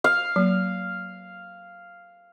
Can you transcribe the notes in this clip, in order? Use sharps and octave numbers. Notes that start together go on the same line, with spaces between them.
F5
F#3 A#3